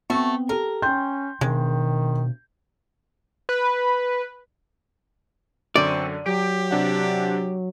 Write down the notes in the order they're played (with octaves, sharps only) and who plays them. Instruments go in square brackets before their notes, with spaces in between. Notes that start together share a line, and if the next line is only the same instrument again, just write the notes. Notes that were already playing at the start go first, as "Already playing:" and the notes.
[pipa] A3 F#4 [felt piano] B3 C4
[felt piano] G4 A4 [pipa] A#4
[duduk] C#4 [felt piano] G5 C6 G6
[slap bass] B2 D4 [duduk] D#3 [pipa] G#3
[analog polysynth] B4
[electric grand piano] F#2 D3 D#7 [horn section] C4 [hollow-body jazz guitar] D5 [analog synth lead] C#6
[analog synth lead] F#3 [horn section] G4 [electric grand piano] D7
[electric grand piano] C3 D4 F#5